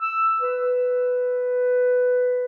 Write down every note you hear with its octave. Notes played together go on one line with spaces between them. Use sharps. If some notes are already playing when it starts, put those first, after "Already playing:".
E6
B4